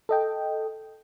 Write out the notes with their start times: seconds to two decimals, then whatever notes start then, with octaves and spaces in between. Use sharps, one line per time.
0.09 A4 D#5 G5